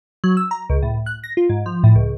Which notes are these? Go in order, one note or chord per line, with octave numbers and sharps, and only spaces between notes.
F#3
E6
A#5
C#2
A2
F#6
A#6
F4
G#2
F3
A2
C#2